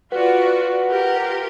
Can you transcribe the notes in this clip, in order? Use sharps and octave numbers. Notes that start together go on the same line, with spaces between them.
F4 F#4 B4 D5 F#5
F4 G4 A#4